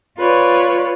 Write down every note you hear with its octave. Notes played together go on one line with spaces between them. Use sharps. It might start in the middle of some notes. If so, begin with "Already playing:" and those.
F4 B4 C#5 D5